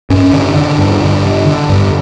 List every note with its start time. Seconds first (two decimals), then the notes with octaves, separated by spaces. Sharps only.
0.10 G2 C#4
0.33 D3
0.56 D3
0.79 G2
1.01 G2
1.25 D3
1.47 D3
1.69 G2